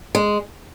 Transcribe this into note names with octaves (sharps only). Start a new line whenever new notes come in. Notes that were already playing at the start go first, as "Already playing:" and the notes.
G#3